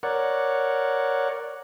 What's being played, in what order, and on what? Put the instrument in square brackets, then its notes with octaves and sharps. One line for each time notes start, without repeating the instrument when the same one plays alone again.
[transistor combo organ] A#4 C#5 D5 F#5